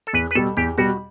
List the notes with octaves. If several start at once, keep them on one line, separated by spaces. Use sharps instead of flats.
A4
E2 B4
B4
B2 G3 A4
E2 G4
B2 G3 F#4